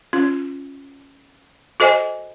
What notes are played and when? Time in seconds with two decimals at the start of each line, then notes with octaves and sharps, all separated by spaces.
0.13 C#4 F4
1.80 F#4 A4 C5 D#5 G#5